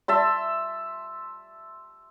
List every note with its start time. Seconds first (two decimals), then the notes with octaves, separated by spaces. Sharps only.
0.08 E5 A5 C6